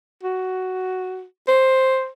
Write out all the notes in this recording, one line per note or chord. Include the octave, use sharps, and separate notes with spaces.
F#4
C5